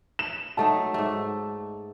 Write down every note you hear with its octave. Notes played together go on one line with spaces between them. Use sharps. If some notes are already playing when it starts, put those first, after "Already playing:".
E7
F#3 A3 D#4 A5
G#2 A3